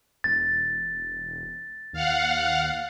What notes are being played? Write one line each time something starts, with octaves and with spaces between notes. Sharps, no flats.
E1 A6
D#2 F5 F#5